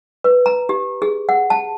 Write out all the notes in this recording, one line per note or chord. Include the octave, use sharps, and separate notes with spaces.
B4
A#5
G4
G#4
F#5
A5